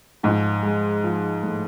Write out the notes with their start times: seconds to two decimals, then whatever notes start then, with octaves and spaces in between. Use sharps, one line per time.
0.23 G#2 F3
0.63 G#3
1.04 F3
1.43 A2